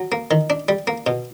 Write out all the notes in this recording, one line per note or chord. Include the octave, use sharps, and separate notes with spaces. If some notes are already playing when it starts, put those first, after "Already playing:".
Already playing: F#3
A#3
D#3
D4
G3
A#3
B2